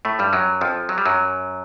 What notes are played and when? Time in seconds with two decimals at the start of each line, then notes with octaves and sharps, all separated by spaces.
0.05 A2 A3
0.19 G2 G3
0.33 F#2 F#3
0.61 F2 F3
0.89 F#3
0.98 G3
1.05 F#2 F#3